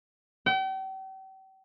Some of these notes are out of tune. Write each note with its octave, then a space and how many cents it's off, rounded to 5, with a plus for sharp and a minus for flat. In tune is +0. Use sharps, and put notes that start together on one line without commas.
G5 -40